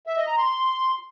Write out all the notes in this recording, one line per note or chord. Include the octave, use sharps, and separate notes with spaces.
E5
D#5
A#5
C6